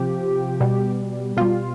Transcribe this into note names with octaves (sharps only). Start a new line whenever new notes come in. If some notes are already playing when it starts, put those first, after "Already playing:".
Already playing: C3 F3 G4
B2 G3
B2 G3 F4